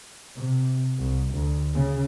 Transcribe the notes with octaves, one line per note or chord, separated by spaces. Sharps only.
C3
C2
D2
C#3